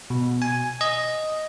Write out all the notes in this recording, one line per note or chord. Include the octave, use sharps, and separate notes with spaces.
B2
G#5
D#5